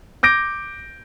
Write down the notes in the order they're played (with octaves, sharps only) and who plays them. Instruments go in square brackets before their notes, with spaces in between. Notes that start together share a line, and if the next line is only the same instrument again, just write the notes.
[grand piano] D6 G6 A#6 D7